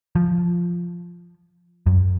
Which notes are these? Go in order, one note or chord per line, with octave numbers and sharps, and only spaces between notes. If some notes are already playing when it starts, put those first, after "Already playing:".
F3
F#2